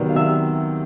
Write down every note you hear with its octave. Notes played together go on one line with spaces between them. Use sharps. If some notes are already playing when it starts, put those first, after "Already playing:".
Already playing: C3 D#3 F#3 B3 D5
F5
C3 E5